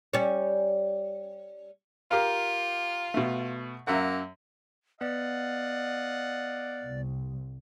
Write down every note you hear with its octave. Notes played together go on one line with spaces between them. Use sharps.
G3 C#4
F4 G4 A#4 F5
B2 A3
F#2 A#3 E5 F#5
B3 D5 D#5 F5 F#5
C2